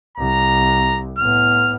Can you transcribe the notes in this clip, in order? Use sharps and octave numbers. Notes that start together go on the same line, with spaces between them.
C2 A#5
A2 B3 F6